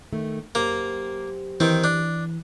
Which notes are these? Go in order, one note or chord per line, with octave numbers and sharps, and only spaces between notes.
D#3 A3
F#2 A#3 G4 C5 A#5
D#3 E3 C4
D4